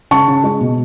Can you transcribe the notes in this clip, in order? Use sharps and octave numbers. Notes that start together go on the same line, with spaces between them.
C#3 A5 C#6
C#3
G#3
B2